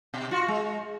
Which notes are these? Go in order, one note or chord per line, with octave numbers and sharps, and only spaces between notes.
B2
F4 F#4
G#3